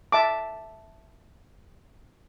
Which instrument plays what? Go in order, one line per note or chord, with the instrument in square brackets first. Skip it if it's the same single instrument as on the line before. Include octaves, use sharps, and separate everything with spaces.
[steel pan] E5 A5 D6